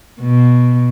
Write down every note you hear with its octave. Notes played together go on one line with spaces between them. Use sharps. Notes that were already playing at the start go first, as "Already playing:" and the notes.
B2